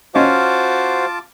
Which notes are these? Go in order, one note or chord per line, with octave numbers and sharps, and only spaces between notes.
C#4 F4 F#4 C5 D#5 F5 A5 D6